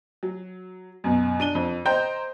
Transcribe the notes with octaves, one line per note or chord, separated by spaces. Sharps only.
F#3
F#2 B2
D4 D#7 G7
F2
C5 D#5 G5 A#5 G6